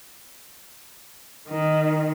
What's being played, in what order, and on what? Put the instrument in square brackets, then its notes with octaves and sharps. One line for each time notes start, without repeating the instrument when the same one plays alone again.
[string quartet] D#3